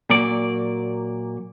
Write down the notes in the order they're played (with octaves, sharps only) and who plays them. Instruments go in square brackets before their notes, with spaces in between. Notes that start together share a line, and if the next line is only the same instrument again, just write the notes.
[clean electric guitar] A#2 F#3 A#3 D5